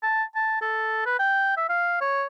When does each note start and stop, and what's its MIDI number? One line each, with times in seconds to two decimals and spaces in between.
0.03 0.24 81
0.35 0.56 81
0.62 1.03 69
1.06 1.19 71
1.19 1.56 79
1.57 1.68 76
1.69 1.96 77
2.01 2.25 73